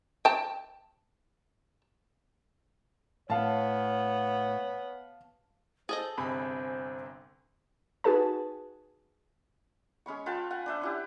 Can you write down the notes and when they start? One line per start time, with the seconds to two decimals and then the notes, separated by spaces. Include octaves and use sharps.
0.25 G5 A5
3.30 A2 B3 C#5 F5 A5
5.89 G#4 A4 C5 D#5
6.18 G1 C3 C4 C5 G#5 B5
8.04 D#4 F#4 G#4 B4 A5
10.06 G#3 C#4 B5 C#6
10.26 F4 B4 G5 A5
10.51 F#5 G#5
10.66 D4 B4 E5
10.82 C#4 E4 G4